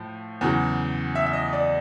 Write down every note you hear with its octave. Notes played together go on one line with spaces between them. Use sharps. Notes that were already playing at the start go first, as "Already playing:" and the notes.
Already playing: A2 F3
E2 C#3 F#3
E5
E5
D#5
D5